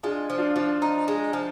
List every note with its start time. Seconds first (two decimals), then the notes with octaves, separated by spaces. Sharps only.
0.03 G#3 D4 F4
0.30 F3
0.38 D4 F4
0.55 F3 D4 F4
0.82 D#4
1.08 G#3
1.33 F3